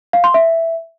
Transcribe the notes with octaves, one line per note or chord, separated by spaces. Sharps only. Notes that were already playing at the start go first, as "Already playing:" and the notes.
F5
C6
E5